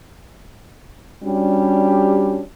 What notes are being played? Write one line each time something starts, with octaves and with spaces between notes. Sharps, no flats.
G3 C#4 D4 F#4 G4